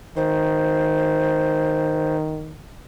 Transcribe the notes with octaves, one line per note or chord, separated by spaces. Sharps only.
D#3 C5